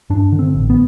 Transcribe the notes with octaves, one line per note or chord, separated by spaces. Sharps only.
G2 D4
D3
C4
A1
B3